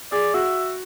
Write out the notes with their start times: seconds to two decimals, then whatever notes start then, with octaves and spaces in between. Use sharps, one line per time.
0.12 G#4 D5
0.34 F#4 E5